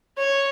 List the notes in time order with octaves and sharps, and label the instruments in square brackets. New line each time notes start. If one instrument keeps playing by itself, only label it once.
[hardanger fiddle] C#5